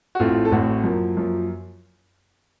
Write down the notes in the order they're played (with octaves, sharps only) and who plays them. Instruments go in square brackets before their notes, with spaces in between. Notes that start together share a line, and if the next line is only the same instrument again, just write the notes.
[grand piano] F#4
A1 A2 A3 C4 F4
A4
A1 A2 A3 C4 F#4
F#2 F3 A#3
F#2 F3 A#3